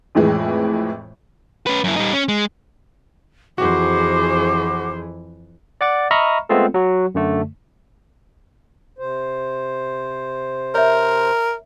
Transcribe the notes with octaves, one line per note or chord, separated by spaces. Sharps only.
F2 A2 E3 G#3
C#4 B4
F#2 E4
G3 D#4
C#4
G#3
F2 E3 F#4 G#4 C5 D6
D5 F#5 D6 A6
D#5 E5 A#5 B5 C#6 F6
G#3 A3 B3 C4 F4 A4
F#3 F#4
F#2 D3 A3
C3 C5
A#4 C#5 E5